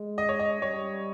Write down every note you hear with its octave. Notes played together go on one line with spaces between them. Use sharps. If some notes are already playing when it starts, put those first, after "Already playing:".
Already playing: G#3
D#5
C#5
D#5
G3 C#5